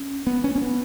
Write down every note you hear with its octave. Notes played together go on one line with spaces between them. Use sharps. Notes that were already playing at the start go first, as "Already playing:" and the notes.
Already playing: C#4
B3
C#4
C#4
B3